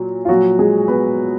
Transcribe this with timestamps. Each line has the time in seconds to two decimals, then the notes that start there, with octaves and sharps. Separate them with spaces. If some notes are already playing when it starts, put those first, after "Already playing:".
Already playing: A#2 F#3
0.25 F4
0.28 A#2 F3 F#3 F#4
0.59 G#3 G#4
0.88 B3 B4